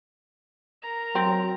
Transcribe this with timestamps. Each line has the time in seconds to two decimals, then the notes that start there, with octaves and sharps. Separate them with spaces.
0.82 A#4 A#5
1.15 F#3 C4